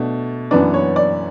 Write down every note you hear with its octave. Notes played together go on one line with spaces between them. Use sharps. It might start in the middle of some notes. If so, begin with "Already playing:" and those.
Already playing: B2 A3 D4
F#2 E3 B3 D4 D5
C#5
D5